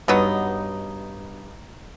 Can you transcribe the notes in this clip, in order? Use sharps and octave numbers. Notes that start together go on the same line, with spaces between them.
G2 B2 F#3 B3 D#4